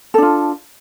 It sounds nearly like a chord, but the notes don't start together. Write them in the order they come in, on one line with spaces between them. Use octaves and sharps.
A4 D4 F4